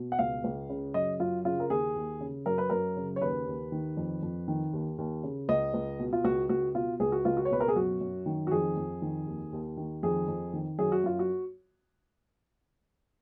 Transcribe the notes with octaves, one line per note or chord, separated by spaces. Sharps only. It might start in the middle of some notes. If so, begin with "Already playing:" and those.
Already playing: B2
F#5
C#2 F5
C#2
C#3
F#2 D#5
F#2 F4
C#3 F4
A#4
D#2 G#4
D#2
C#3
F#2 A#4
B4
F#2 A#4
C#3
C#5
D#2 B4
D#2
D#3
F2
F2
D#3
D#2
D#2
C#3
C#2 D#5
C#2
B2
F4
C#2 F#4
C#2 F#4
B2 F4
C#2 G#4
F#4
C#2 F4
F#4
C#5
B2 B4
A#4
G#4
F#2 F#4
F#2
D#3
F#4
F2 G#4
F2
D#3
D#2
D#2
D#3
F2 G#4
F2
D#3
F#2 G#4
F#4
F#2 F4
F#4